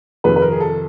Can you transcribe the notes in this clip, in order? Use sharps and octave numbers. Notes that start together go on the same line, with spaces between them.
F2 C3 D#3 B4
B4
A#4
G#4
A4